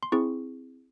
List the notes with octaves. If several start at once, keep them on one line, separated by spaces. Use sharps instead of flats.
C6
C4 E4 G#4 C#6